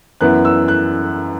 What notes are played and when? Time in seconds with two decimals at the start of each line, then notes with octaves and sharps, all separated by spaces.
0.21 F#2 E3 B3 E4 F#6
0.45 E6
0.68 F#6